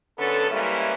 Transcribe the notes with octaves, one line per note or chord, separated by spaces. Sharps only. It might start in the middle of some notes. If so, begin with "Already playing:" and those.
F#2 D3 B3 C#4 A4
E3 G3 G#3 A#3 C#4 E4